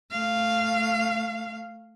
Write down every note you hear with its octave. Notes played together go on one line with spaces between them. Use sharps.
A3 F5